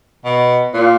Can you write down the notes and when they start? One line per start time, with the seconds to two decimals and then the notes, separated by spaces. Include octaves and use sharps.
0.24 B2
0.73 A#2